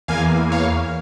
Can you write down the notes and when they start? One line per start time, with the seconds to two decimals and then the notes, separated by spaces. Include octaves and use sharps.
0.08 E2 E3 A#3 F5 G#5
0.52 C#5 F5